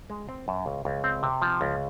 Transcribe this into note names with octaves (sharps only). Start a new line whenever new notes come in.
G#3
C4
F#2
C#2
C#2
C4
C3
F3
C#2